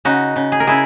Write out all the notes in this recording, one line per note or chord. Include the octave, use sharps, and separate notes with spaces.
C#3 D#4 F#4
C#3
G#4
A#4
C#3 E4 G#4